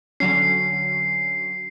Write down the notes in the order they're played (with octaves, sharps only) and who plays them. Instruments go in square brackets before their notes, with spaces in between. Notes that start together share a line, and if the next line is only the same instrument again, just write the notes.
[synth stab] D3 F#3 C#4 [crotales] C7